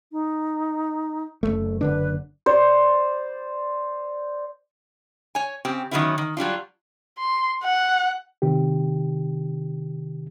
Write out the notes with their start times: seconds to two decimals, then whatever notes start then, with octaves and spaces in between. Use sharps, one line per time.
0.12 D#4
1.43 F#1 C#2 A3
1.81 F#1 D3 D4 B4
2.46 C5 D5
5.35 C#5 G#5
5.65 C#3 C4 G4
5.91 D#3 E3 F#3 B3 C#4 E4
6.18 D#3
6.37 F#3 G3 D4 F4
7.18 C6
7.64 F#5
8.42 C3 D#3 G4